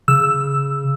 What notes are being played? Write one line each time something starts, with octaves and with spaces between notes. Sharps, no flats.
C#3 E6